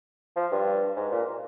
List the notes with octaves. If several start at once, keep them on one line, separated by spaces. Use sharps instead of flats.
F3
G2
G#2
A#2